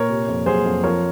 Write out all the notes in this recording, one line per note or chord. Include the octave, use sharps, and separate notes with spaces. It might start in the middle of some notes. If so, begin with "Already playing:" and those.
Already playing: A#2 A#4 C#5
C3
F2
F#3 G#4 C5
F2
F3 A#4 C#5